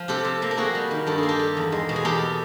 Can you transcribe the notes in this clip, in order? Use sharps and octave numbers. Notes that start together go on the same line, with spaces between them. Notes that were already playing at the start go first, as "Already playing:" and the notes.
Already playing: F3
C3 G4 A4
C3
A#3
A4
A#3 F#4 G#4
G3
D#3
G2 A4
G#4
A#3
G4 A4
G3
E2
G#3
B2
G#4
E2 G4 A4